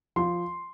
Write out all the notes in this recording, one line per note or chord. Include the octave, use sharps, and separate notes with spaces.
F3 C6